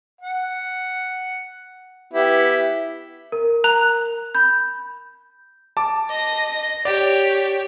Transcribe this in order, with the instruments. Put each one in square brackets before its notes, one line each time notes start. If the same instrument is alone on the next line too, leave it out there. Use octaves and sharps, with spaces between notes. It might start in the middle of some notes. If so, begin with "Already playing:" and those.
[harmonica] F#5
B3 E4 G4
[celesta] A#4
[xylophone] A#5 F#6
[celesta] B5 G6
[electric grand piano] A5 D6
[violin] D#5 A#6
[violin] G4 C#5 [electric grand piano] D5